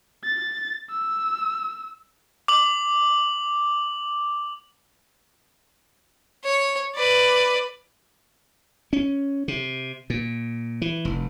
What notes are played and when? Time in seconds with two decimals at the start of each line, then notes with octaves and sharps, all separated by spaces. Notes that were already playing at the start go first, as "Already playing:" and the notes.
0.24 A6
0.91 E6
2.48 D6 F#7
6.44 C#5
6.95 B4 D5
8.93 C#4
9.48 C3
10.10 A#2
10.82 E3
11.05 F1